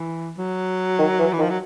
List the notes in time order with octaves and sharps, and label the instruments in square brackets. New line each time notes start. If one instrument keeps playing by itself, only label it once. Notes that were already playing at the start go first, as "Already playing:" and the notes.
Already playing: [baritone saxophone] E3
F#3
[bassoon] D#3
E3
[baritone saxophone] E3
[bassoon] D#3
[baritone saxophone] F3
F#3